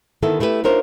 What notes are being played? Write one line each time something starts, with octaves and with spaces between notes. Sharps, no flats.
D3 D#3 B3 E4 A4
A3 E4 G4 G#4 B4
D4 D#4 F4 A#4 C5 C#5